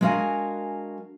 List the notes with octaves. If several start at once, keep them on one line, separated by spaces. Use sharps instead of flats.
G#3 D4 F#4 A#4 F5 G#5